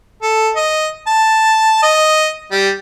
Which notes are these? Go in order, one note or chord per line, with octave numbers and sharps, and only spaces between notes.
A4
D#5
A5
D#5
G3